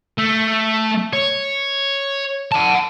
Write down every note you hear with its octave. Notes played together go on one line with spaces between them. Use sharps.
A3
C#5
F#5 A5